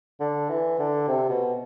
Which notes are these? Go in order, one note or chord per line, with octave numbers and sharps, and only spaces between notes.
D3
E3
D3
C3
B2